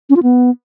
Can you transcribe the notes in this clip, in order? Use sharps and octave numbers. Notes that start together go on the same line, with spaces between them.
C#4
F4
B3